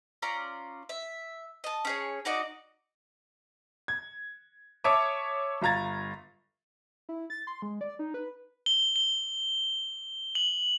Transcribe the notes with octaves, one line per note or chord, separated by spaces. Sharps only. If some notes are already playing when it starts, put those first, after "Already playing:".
C#4 F4 D5 A#5
E5
D#5 A5
C#4 G#4 C#5
D#4 F#4 D5 D#5
G#6
C#5 E5 A5 D6 D#6
G1 F4 A#5 G#6 A6
E4
A6
C6
G#3
D5
D#4
B4
G7
G7
F#7